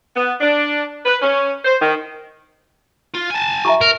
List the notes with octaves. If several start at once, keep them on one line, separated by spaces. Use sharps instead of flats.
B3
D4
B4
C#4
C5
D#3
F4
G#5 A5
E5 A#5 C#6
A#4